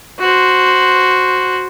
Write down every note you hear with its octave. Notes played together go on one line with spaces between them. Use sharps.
F#4 C5